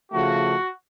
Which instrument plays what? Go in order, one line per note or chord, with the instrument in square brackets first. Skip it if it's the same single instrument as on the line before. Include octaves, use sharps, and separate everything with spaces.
[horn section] C#3 F3 A3 F#4